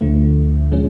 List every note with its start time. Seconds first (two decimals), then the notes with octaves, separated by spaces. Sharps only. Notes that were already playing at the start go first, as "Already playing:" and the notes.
0.01 D2 D3 F3 A3
0.72 A#2 F3 G#3 C#4